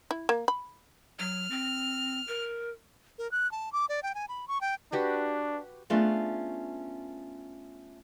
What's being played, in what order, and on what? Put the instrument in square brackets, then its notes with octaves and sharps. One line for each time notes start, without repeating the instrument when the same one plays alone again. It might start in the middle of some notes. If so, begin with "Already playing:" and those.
[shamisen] E4
A#3
B5
[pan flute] F#3 [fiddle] F6
[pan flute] C4
A#4
[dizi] A#4
F#6
A5
D6
D5
G5
G#5
B5
C#6
G5
[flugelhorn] D4 [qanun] F#4 G4 B4
[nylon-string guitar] A3 B3 C#4 D4 F4 G#4